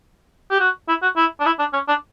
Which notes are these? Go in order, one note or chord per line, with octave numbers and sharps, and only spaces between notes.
G4
F#4
E4
F#4
E4
D4
E4
D4
C#4
D4